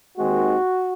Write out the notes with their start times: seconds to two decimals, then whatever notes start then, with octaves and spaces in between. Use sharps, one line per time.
0.18 D#2 D#3 G#3 C4 F#4